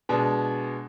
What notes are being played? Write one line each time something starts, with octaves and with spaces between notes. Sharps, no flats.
B2 G#3 D4